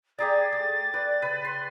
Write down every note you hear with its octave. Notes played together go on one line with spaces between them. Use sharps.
G4 G#4 D5 A#5 A6
A3
B4 D5
C#3 B4
C6